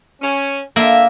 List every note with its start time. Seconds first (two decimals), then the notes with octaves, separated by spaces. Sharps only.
0.22 C#4
0.76 D3 A#3 E5